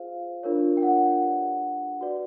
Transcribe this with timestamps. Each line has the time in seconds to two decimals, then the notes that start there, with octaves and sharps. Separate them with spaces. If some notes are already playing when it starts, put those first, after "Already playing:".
Already playing: F4 G#4 C5 F5
0.43 D4 F4 A#4 C#5
0.77 G5
0.83 F#5
1.22 D4 G4 B4 D5
2.01 F#4 B4 D5